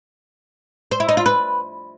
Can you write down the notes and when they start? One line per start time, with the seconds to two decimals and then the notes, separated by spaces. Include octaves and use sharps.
0.91 C5
1.00 E4
1.09 D#4
1.17 F4
1.26 B4